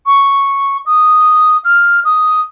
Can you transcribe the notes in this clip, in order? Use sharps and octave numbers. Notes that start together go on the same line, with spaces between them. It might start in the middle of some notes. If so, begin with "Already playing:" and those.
C#6
D#6
F6
D#6